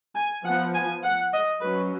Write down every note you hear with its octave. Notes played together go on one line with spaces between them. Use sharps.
G#5
F3 B3 F#5
G#5
F#5
D#5
F#3 C#4 B4